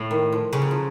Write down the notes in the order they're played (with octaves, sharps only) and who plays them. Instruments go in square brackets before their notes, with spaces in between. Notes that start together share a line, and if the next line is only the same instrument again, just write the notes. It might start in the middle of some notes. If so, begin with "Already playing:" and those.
Already playing: [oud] A2
[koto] D#3
F3
[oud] C#3 [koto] G3
[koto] F#3
F3